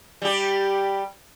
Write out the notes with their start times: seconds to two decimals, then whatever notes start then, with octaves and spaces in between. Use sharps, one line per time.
0.22 G3 G4